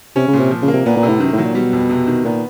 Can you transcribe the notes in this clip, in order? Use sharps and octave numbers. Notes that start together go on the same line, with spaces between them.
C3 C#4
C#3
A#2
C3
F3
C#3
A#3
C3
A#2 B3
A#2
C3
A2
F#2 D#3
A2
F#3
A#2
B2 G3
F2
C3
D#3
A#2 B3